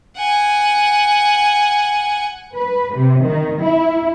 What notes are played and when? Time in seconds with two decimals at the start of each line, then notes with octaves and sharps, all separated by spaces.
0.17 F#5 G#5
2.57 B4
2.95 C3
3.25 D#3
3.62 E4